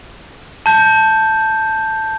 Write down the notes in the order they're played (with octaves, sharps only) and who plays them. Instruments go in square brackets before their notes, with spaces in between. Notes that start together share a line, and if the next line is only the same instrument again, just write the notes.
[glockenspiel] A5 G6